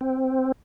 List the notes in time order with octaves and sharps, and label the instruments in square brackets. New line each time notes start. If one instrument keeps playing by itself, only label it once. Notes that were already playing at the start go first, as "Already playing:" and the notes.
[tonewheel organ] C4